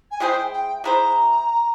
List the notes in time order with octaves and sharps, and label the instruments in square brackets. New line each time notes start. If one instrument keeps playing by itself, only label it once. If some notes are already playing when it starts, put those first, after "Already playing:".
[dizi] G#5
[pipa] G#3 E4 G#4 C5 [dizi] G5
[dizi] G5
[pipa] G#3 E4 G#4 C5 [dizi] A#5